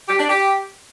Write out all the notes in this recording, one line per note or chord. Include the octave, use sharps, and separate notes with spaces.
G4
D4
G4